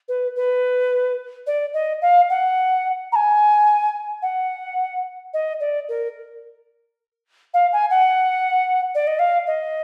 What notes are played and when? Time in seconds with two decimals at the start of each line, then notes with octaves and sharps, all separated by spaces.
0.08 B4
0.36 B4
1.47 D5
1.74 D#5
2.02 F5
2.30 F#5
3.12 A#5
3.16 G#5
4.22 F#5
5.33 D#5
5.60 D5
5.89 A#4
7.54 F5
7.73 G#5
7.90 F#5
8.95 D5
9.07 D#5
9.19 F5
9.47 D#5